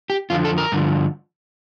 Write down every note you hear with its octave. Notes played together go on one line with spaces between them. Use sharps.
G4
F2 D3 F3 F4
A4
A#4
G2 D3 F3